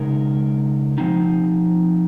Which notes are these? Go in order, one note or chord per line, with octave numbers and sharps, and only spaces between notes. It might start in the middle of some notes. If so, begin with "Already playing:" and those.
Already playing: C#3 G#3 D#4 A#4
F3 C4 D#4